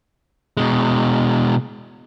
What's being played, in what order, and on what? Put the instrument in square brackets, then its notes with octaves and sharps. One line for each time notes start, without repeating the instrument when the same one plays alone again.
[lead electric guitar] B2 G#3